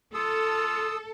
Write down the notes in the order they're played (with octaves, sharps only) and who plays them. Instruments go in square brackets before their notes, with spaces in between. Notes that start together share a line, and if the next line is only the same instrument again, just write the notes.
[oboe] F4 [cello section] A4 [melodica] D#6 E6